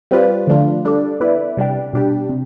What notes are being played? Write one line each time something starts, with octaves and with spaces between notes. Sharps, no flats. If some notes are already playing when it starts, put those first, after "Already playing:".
G3 C4 F4 B4 D5
D3 F3 A3 D4 F4
G3 D4 A4 D5
B3 E4 B4 D5
C3 G3 D4 G4
B2 G3 D4 G4
C3